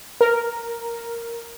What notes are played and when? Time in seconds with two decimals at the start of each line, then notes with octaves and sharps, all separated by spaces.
0.21 A#4